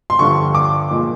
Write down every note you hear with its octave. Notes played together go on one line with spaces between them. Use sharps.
C6
G2 D3 F3 C#6
D6
A#2 F3 G#3